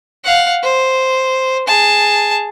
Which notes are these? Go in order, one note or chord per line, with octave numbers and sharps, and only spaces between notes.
F5 F#5
C5
G#4 A5